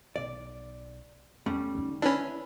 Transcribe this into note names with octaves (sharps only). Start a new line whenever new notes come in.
B1 D5
E2 G3 A3 C#4
D3 D#4
C#4 D4 E4 B4 B5